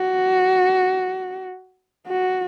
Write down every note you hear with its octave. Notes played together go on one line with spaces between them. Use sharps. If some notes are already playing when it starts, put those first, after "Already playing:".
Already playing: F#4
F#4